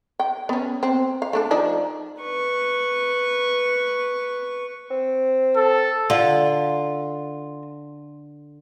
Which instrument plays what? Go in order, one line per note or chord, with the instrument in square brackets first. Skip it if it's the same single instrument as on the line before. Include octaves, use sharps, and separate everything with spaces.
[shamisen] G5
B3 C#4
C4
F5
A3 D4 A4
F3 D4 D#4
[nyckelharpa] B4 C#6
[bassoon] C4
[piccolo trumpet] A4
[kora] D3 [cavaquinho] F4